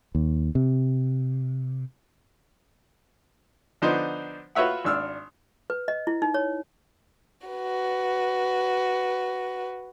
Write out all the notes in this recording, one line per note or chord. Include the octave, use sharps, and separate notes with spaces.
D#2
C3
D3 F3 B3 D4 D#4 C5
F4 F#4 B4 C#5 E5 F#5
G#1 D4 E6 F6
B4
D#5
E4
D#4
C#5
F#4 B4